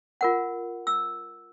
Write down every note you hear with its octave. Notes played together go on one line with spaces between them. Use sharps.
F4 A#4 F#5
E6